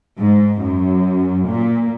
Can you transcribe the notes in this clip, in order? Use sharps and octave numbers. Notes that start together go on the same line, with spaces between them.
G#2
F#2
A#2